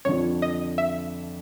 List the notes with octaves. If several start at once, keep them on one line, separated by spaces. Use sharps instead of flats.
F2 D3 F3 C#5
D#5
E5